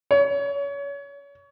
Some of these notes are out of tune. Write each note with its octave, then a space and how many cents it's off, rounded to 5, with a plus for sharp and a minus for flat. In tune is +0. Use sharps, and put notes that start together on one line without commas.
C#5 +30